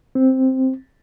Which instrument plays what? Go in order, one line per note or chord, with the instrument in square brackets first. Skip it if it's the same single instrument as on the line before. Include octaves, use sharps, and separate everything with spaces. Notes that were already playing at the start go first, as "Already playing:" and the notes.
[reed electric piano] C4